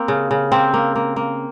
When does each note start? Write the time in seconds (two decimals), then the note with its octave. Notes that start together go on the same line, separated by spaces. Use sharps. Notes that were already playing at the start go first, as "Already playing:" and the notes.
Already playing: A#3 C4
0.08 C#3
0.31 C#3
0.52 A#3 C4
0.74 A#3
0.96 A#3
1.16 A#3